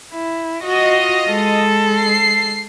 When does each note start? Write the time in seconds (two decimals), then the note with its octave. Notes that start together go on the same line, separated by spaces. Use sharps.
0.13 E4
0.64 F4 F#4 D#5
1.26 G#3 A4
1.98 C7